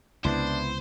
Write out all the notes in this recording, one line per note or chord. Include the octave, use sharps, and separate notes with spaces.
C#2 C3 B3 D4 E4 C5